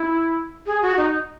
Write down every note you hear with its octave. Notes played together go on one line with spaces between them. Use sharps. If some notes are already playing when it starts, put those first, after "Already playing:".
Already playing: E4
G#4
F#4
D#4